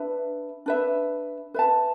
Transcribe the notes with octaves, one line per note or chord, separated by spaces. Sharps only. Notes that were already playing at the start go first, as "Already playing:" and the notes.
Already playing: D4 B4 E5
D4 B4 E5
B4 E5 A5